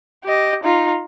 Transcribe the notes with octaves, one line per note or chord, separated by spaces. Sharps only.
G4 D#5
D#4 F4